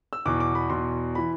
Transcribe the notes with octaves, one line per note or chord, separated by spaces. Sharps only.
E6
E2 B2 D6
D6
B5
E2 B2 C6
E3 B5